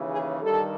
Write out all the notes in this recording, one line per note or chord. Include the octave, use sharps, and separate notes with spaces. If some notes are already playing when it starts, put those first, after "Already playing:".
Already playing: D#2 C#3 E3
G#4
G2 D#3 G3 A4